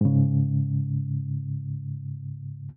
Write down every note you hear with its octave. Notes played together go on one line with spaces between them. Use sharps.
G#2 C#3